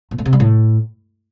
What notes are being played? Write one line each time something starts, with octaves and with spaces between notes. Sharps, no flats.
A#2
A2
C3
G3
A2